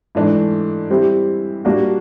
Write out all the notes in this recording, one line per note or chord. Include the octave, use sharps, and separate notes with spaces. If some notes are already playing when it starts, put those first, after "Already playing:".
G#2 E3 A3 D4
G3 C4 E4 G4
A#2 G3 A#3 D4 F#4